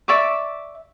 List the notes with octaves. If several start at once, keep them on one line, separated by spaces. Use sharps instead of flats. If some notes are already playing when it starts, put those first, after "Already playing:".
D5 E5 C#6 D6